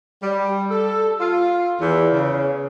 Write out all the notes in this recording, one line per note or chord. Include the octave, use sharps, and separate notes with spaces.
G3
A4
F4
E2
C#3